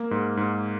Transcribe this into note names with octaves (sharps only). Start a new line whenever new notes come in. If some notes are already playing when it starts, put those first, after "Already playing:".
Already playing: A#3
G#2
G#2